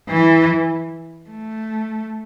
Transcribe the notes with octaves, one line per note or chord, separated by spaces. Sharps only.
E3
A3